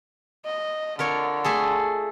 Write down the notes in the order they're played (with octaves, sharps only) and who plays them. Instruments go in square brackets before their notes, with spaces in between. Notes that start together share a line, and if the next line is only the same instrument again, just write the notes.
[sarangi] D#5
[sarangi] D3 [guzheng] F4 A#4 C#5
[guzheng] A3 G#4 A4